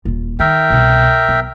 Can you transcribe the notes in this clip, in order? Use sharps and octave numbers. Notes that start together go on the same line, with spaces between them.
D#1 F4
D#3 A#4 E5 G5
C2 B2
B1